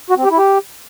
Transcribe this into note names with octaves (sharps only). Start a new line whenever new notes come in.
F#4
C4
G4
E4
G4